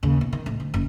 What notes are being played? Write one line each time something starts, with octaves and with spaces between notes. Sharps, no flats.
D#2 C#3
B1
D#3
A1 A2
D2
F#1